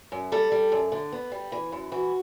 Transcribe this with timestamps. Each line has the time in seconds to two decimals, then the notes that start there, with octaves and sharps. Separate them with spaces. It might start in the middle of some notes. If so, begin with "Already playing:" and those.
0.12 F#2
0.32 G3 A4
0.52 G3
0.72 F#2
0.92 D3
1.12 B3
1.32 G3
1.52 E3
1.72 F#2
1.92 E3 F#4